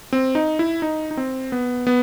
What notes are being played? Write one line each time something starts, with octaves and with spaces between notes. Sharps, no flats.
C4
D#4
E4
D#4
D#4
C4
B3
B3